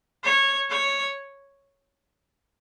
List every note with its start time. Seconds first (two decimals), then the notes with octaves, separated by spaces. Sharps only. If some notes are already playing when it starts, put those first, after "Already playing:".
0.24 C#5
0.70 C#5